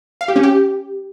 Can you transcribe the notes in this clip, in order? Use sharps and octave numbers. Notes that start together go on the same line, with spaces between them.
F5
G4
C#4
G4